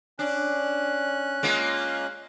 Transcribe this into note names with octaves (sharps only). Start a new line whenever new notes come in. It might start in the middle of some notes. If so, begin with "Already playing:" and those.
C#4 D4 F#6
G#3 A#3 F4